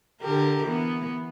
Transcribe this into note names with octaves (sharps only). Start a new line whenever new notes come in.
D3 G4 A#4
E3 B3